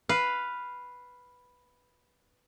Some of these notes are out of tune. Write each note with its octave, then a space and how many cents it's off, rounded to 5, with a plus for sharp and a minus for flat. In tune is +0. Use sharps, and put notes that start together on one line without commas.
B4 +0 F5 +0